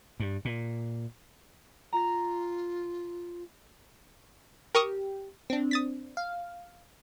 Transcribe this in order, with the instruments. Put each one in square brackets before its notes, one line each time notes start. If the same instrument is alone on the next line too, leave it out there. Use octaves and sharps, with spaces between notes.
[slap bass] G2
A#2
[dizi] F4 [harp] A#5 A#6
[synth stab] G4 [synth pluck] A#4 C#6 D#6
[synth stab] C4 D4
[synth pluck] D#6 A6 B6
[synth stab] F5